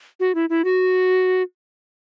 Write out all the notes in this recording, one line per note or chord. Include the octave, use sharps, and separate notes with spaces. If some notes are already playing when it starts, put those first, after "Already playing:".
F#4
E4
E4
F#4